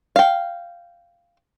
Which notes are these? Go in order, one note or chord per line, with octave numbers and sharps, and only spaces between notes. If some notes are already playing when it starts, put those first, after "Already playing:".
F5 G5